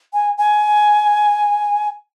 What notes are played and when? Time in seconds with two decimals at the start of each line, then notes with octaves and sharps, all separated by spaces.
0.13 G#5
0.38 G#5